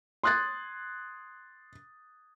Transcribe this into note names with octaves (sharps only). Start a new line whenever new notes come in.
C6 D#6 F#6 G#6 A6